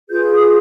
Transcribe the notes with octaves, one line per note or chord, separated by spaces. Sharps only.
F4 G#4 B4 G6
D#6